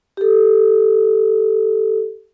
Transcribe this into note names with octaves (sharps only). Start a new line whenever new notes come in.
G4 A4